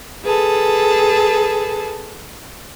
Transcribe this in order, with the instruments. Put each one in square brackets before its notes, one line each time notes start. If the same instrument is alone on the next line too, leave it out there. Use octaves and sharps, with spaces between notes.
[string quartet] G#4 A4 B4 A5